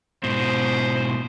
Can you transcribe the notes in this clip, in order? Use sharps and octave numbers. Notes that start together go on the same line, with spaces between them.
G#2 B2 C5